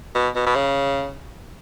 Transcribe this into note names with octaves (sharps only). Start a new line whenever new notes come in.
B2
B2
B2
C#3